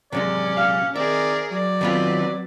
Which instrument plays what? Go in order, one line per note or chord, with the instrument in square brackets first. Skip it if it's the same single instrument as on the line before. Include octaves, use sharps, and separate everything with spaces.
[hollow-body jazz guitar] C3 F#3 G#3 [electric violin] C#4 [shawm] D5
[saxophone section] A#2 G4 F5
[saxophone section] D#3 C4 [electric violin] G#4 A#4 [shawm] D5 [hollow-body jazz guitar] E5
[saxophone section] F#3 [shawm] D5
[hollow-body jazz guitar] D#3 B3 F4 [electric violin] C4 B4